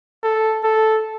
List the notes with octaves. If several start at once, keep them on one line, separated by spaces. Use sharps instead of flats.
A4
A4